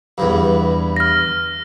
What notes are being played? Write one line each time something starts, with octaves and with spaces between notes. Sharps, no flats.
E2 G2
F6 A#6